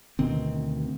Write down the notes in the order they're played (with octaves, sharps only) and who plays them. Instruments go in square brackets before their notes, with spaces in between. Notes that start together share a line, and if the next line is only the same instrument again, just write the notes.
[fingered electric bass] D2 B2 D#3 C4